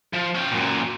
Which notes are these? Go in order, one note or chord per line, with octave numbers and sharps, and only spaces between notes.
F3
C#4 G5
F#2 A#2